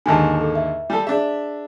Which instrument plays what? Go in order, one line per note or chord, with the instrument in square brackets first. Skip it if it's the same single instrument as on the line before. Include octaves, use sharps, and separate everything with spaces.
[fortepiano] D#2 G#2 D3 [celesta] G#5 A5
[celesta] A4
E5
[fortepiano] G3 A4
[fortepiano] D4 E5 [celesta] G#4